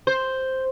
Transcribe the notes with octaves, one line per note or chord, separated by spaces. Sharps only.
C5